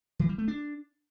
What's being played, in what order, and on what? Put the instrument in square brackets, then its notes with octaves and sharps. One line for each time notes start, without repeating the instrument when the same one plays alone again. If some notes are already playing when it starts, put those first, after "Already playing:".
[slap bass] E3
G3
A3
D4